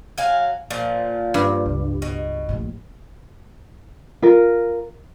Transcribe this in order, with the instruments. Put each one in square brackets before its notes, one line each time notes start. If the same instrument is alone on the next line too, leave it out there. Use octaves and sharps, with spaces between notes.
[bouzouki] F#3 F5 G#5
A#2 F3
[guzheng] G2
[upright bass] C#2
[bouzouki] B2
[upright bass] A#1 A2
[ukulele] F4 A#4